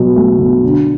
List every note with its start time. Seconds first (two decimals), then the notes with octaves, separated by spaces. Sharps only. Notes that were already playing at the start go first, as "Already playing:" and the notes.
Already playing: B2 F#3
0.16 A3
0.39 B2
0.63 D3